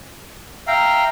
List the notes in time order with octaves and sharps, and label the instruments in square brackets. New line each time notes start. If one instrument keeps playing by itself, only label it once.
[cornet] E5 [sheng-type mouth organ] F5 G5 A#5